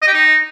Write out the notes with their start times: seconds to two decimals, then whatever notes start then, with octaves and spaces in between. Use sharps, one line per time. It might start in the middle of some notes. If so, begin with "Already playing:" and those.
0.02 D#5
0.08 G4
0.14 D#4